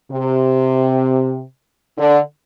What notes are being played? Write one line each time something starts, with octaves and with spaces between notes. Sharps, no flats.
C3
D3